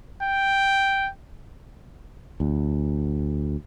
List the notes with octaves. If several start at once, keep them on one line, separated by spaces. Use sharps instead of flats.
G5
D2